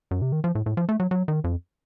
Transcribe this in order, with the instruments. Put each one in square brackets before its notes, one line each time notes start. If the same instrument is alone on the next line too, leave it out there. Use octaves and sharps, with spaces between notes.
[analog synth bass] F#2
C3
D#3
F3
A2
A2
F3
A3
F#3
F#3
D#3
F2